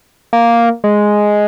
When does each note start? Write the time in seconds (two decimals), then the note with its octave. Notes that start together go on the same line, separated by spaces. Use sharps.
0.33 A#3
0.84 G#3